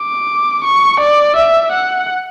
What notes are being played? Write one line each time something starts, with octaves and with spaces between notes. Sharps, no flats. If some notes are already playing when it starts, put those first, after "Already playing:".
Already playing: D6
C#6
D5
E5
F#5